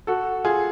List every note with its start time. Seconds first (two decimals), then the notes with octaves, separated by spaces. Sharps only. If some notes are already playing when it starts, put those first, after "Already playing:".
0.07 F#4 A4
0.44 F4 G#4